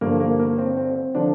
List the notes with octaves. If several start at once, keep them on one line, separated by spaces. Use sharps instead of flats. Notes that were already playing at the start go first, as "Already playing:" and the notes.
G2 D3 F3 A#3
A#3
A#3
C4
C4
C4
D3 F3 D4